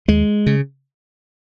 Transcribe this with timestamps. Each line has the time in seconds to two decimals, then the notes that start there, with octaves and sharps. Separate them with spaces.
0.08 D#2 G#3
0.46 C#3